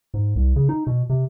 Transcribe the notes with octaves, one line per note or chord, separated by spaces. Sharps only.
G#2
C2
C#3
D#4
B2
C3